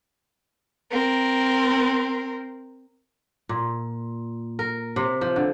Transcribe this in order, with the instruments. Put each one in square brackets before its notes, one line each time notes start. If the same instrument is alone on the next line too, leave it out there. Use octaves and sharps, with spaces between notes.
[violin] C4 A#4
[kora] A#2
A#4
C3
F3
D3